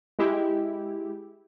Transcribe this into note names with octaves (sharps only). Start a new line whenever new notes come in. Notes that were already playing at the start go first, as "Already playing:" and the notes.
G#3 E4 G4